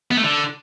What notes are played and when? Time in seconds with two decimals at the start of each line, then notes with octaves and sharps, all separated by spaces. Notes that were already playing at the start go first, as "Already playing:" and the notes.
0.11 B3
0.17 A3
0.24 D3